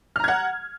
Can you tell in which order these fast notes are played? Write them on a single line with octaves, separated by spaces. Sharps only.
F6 A#5 G#6 F#5